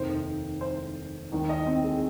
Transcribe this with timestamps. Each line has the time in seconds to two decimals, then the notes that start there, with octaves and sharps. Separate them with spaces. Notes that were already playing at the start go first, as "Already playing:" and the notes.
Already playing: F1 D#2 D#3 C5
0.61 C5
1.32 D#2 D#3
1.49 D#5
1.67 C4
1.84 G#4